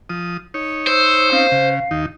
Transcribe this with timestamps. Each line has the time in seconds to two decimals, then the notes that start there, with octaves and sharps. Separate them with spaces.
0.09 F3 D#6
0.54 D#4 C#5
0.87 C5 E6
1.32 C4 C#4 D#4 F5
1.52 C#3
1.91 D#2 D#4